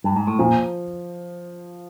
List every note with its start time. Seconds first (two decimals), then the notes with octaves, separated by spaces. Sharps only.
0.04 G2
0.16 G#2
0.27 A2
0.39 A#2 F3